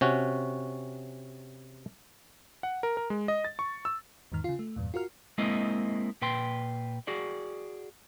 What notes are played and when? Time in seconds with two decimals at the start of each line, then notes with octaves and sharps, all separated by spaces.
0.01 C3 C#4 F#4
2.63 F#5
2.83 A#4
2.97 A#4
3.10 G#3
3.28 D#5
3.44 A6
3.59 C#6
3.85 E6
4.32 E2 G#2 D#3 F6
4.44 C#3 F4
4.59 A3
4.76 E2 G2 A#2
4.94 F4 F#4 A#4 F6
5.38 G#3 A#3 C4 E4 D#5
6.22 A#2 B4 G5 C6
7.07 F#4 G#4 D5